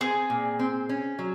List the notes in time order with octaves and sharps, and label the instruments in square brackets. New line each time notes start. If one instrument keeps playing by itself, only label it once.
[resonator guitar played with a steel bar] C4 [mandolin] G#4
[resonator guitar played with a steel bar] A#2
C4
C#4
F#3